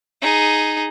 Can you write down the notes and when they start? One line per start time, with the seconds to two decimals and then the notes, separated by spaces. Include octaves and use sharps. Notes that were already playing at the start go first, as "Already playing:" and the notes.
0.21 D#4 G#4